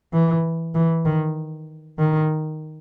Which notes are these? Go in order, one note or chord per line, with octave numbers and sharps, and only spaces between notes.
E3
E3
D#3
D#3